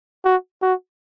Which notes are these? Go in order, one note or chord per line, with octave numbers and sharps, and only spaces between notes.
F#4
F#4